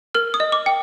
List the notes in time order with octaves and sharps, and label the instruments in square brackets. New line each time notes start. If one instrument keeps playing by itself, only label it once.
[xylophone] A#4 F6
D#6
D#5
D6
G5